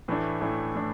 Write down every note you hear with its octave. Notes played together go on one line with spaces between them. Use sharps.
A2 E3 A3 D4
A2 E3 A3 D4
A2 E3 A3 D4